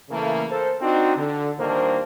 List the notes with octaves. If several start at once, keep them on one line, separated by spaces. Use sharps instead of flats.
C#3 E3 A3 A#3
A4 A#4 C5
C4 D4 D#4 F#4
D3
A#2 D#3 G3 A#3 D4 C5